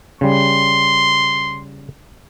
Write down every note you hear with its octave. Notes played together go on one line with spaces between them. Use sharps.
C#3 G3 C6